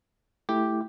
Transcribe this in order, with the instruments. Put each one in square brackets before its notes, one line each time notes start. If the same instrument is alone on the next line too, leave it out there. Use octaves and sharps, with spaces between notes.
[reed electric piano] A3 E4 [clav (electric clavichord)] G4